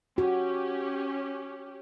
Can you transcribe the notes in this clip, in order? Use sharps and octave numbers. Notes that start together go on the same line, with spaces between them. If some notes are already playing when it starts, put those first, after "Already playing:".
C#4 F#4 G4